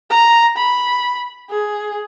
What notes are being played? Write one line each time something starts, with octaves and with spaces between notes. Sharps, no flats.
A#5
B5
G#4